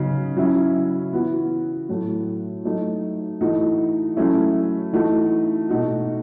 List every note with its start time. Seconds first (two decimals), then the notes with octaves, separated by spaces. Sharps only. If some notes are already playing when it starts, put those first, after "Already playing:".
Already playing: C#3 F#3 B3 D#4
0.37 F#3 C#4 E4
1.13 E3 B3 F#4
1.89 A2 F#3 A3
2.65 F#3 A3 D#4
3.41 E3 A3 D#4 F#4
4.16 F#3 A3 C#4 E4
4.93 E3 A3 D#4 F#4
5.69 B2 A3 D#4 F#4